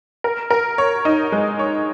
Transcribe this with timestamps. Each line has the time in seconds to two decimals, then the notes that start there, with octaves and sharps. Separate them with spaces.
0.24 A#4
0.51 A#4
0.78 C#5
1.05 D#4
1.32 G#3
1.59 C#5